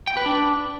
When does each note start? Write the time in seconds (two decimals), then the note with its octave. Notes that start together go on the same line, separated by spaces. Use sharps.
0.07 G5
0.17 B4
0.26 D4